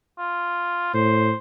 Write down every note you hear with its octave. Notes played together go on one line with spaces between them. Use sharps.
F4
A2 C5